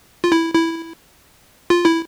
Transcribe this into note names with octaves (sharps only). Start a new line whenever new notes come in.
F4
E4
E4
F4
E4